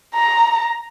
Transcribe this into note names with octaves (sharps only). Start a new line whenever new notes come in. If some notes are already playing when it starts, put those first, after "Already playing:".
A#5